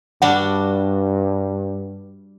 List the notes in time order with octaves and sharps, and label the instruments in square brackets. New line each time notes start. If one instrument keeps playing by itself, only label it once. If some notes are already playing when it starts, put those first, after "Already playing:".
[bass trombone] G2 [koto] G3 D4 F#4 [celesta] F#5